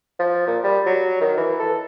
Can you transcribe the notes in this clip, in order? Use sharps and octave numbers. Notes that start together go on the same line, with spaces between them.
F3
A#2
G3
F#3
D#3
E3
A4